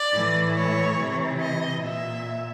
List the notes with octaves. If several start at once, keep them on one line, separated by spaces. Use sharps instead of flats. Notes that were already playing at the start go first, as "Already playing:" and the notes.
Already playing: D5
A2 E3
C#5
C3 E3
D#5
A#2 E5